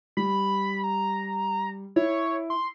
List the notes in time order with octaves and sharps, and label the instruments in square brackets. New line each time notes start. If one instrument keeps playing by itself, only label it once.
[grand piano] G3 [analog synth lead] B5
[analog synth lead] A#5
[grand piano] E4 [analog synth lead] C#5
[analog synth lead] C6